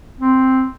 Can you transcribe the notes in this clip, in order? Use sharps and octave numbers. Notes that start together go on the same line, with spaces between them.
C4